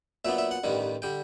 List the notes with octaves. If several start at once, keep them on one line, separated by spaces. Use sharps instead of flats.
A#2 F#3 B3 D4 E5
E5
F#5
A1 G2 D#3 G3
D3 G3 G5